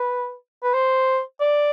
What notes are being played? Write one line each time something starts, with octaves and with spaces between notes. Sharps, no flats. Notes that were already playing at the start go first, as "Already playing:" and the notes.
Already playing: B4
B4
C5
D5